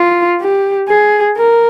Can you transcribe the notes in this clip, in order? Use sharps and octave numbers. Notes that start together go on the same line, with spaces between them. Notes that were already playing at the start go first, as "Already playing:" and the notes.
Already playing: F4
G4
G#4
A#4